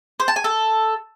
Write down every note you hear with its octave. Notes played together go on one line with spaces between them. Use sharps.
C5
A5
G#5
A4